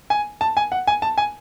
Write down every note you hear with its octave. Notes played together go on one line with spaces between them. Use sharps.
G#5
A5
G#5
F#5
G#5
A5
G#5